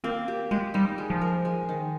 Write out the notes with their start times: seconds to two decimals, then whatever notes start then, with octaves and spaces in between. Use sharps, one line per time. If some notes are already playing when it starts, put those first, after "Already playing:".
0.04 A#3 C4
0.28 G4
0.51 G#3 G4
0.74 G3 D#4
0.98 G#3
1.10 F3
1.22 A#4
1.45 G#3
1.69 D#3